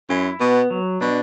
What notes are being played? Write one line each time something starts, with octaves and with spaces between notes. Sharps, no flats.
F#2 E4
B2 B3
F#3
B2 D4